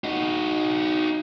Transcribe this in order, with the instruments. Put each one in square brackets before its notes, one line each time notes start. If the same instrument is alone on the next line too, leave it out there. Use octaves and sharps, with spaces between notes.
[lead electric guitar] D#4 F#4